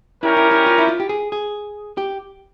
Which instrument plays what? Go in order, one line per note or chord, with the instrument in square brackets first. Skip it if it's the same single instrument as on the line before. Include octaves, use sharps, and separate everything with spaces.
[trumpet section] G3 C#4 G4 A#4 [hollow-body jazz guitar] E4
[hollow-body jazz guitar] E4
E4
F4
E4
F4
G4
G#4
G#4
G4